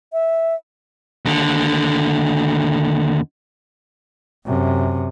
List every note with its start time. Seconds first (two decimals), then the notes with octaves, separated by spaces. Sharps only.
0.13 E5
1.25 D#2 D3
4.46 F#2 C3